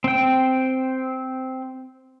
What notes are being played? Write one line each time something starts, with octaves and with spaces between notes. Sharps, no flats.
C4 G5